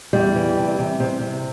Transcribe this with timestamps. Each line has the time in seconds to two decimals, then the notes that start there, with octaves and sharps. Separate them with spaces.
0.13 E2 G3
0.36 E3
0.57 C3
0.79 C3
1.00 C3
1.21 C3